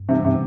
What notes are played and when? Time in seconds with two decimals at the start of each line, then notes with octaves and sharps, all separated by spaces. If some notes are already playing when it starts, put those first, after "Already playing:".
Already playing: G2
0.09 C3 E3 G3 B3
0.25 C3